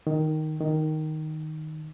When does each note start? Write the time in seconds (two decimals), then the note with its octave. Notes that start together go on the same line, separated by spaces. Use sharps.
0.07 D#3
0.61 D#3